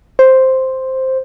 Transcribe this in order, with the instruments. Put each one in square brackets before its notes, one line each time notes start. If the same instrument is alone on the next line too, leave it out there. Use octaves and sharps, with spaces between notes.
[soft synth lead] C5